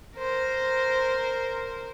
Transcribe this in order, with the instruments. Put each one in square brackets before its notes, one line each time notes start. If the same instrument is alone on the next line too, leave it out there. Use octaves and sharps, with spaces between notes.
[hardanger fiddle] A#4 C5